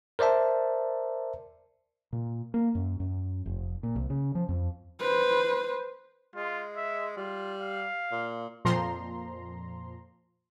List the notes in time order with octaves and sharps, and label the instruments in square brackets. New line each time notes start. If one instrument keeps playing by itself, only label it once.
[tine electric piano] A#4 C5 D5 E5 A5
[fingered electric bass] A#2
A#3
F#2
F#2
F1
A#2
C2
C#3
F3
F2
[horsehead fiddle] B4 C5
[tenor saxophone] G#3 [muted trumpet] F4
[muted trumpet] E5
[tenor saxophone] G3 [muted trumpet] F4
[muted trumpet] F5
[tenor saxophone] A#2
[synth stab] F2 A#2 F3 A#5 C6